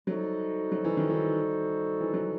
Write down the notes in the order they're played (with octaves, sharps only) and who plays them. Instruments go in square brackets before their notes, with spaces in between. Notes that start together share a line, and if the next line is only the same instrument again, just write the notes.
[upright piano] F#3 [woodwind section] G3 D#4 F#4 A4 C5
[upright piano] F#3
E3
D#3
E3
E3
F#3